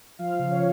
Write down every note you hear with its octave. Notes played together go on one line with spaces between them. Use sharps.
F3 F5
C#3
C#5